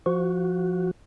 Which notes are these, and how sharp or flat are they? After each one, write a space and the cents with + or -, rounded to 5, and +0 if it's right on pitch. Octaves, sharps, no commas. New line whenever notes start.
F3 +0 F#4 +0